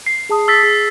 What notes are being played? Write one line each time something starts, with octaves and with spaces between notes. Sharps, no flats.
C7
G#4 A5 D#6
E6 A6 B6
G#4